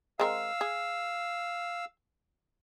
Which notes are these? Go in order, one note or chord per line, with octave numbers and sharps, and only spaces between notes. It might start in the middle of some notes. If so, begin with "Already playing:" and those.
G#3 C4 A#4 F5 E6
G#4